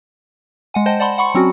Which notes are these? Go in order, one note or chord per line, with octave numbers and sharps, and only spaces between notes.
G#3 F#5 G#5
C5 D#5 F#5 G5 A5
D5 F#5 A5 B5 C6
F#5 B5 C#6 C#7
F#3 C4 C#4 F#4